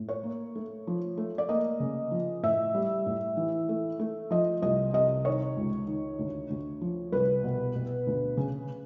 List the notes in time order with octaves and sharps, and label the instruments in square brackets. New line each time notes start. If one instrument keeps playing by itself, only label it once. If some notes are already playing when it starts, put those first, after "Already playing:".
Already playing: [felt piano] A2
C#5
A#3
A3
F3
A3
D5
A#3 D#5
C#3
F3
A2 E5
G3
A2
E3
A3
A3
F3 D#5
C2 D#5
C3 D#5
D#3 C#5
C#2
D#3
D2
D2
F3
C2 B4
B2
B2
D2
C#3